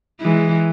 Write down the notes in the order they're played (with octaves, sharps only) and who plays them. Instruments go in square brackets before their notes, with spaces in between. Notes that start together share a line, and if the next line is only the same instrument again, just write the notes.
[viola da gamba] E3 G#3